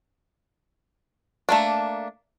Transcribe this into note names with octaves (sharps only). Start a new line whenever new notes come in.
A3 A#3 D4